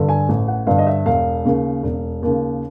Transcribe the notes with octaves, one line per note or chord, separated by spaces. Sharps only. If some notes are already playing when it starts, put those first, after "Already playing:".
Already playing: G2 D3
G#5
A1
F#5
G2 D3 F5
D#5
E5
E1 F5
D#2 C#3
E1
D#2 C#3